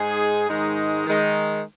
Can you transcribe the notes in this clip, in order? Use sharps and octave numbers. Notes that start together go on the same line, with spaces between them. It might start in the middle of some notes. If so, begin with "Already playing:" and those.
Already playing: G#2 G#3 D#4 G#4
G#2 D#3 G#3 D#4
D#3 G#3 D#4